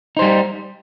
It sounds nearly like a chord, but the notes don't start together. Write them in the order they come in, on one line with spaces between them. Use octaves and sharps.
D#4 C5 G3